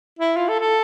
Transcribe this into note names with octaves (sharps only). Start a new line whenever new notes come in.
E4
F4
A4
A4